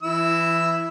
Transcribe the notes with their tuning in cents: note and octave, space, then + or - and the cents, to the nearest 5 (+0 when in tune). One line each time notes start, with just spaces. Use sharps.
E3 +25 E4 +0 E6 +0